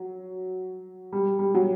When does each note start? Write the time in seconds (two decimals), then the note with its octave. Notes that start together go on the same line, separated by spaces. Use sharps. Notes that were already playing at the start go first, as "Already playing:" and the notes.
Already playing: F#3
1.12 G3
1.39 G3
1.55 F#3